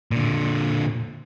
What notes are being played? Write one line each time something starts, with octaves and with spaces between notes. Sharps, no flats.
A#2 D3